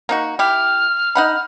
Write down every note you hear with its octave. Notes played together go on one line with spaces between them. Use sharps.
A#3 D#4 F#4
E4 G4 F6
D#4 F#5 B5